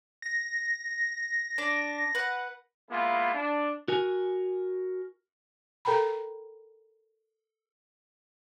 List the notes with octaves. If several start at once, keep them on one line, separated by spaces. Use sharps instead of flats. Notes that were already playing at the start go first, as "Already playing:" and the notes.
A#6
D4
B4 F#5
G#3 A#3 B3 E4 F4
D4
F#4 A#4 G#5
A4 A#4 G5 A#5 B5